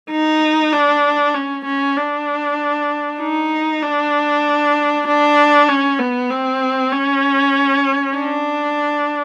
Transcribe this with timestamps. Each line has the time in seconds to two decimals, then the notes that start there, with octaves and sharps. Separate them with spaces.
0.11 D#4
0.72 D4
1.35 C#4
1.65 C#4
1.96 D4
3.20 D#4
3.83 D4
5.07 D4
5.68 C#4
5.99 B3
6.31 C4
6.92 C#4
8.16 D4